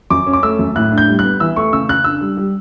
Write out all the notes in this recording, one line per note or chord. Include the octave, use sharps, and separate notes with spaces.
F#2 D6
C#4
D6
A3 E6
F#2
A2 F#6
D4
G6
G3
B3 F#6
E3 E6
A3 C#6
C#3 E6
C#3 F#6
D4 E6
G3
G3